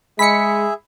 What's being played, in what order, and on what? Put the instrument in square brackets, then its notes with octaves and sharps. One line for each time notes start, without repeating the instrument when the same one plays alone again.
[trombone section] G#3 [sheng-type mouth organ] G#4 E5 [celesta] B5 [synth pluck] B6 C#7